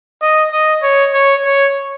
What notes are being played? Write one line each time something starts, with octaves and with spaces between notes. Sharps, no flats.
D#5
D#5
C#5
C#5
C#5